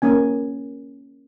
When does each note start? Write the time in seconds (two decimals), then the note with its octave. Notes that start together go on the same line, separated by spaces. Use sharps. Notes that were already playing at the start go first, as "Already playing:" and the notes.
0.02 A#3 C#4 G#5